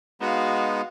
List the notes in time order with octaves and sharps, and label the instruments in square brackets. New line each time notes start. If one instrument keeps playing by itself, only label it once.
[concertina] G#3 B3 D#4 [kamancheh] F#4 F5